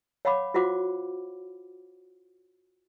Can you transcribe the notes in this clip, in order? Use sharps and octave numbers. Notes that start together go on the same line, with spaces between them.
C#5 F5 F#5 B5 D6
F4 F#4 C5 F#5 D6